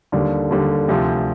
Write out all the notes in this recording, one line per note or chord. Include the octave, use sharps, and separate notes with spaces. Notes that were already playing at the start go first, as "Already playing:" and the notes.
D#2 D3 G3
D#2 D3 G3
D2 C3 F3